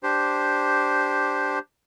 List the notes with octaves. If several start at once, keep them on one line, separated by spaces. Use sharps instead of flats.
D4 G4 C5